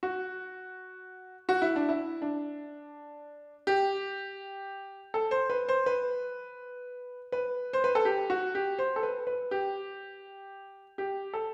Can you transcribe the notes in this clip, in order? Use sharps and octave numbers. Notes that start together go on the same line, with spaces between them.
F#4
F#4
E4
D4
E4
D4
G4
A4
C5
B4
C5
B4
B4
C5
B4
A4
G4
F#4
G4
C5
A4
B4
B4
G4
G4
A4